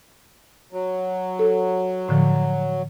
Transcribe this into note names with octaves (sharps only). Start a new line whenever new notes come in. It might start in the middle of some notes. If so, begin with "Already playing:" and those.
F#3
A4
A2 D3 F3